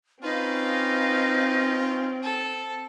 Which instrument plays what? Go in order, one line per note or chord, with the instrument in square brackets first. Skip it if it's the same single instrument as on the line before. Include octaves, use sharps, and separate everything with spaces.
[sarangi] C4 [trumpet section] C#4 F4 [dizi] D#4 [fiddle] B4 F5
[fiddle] A4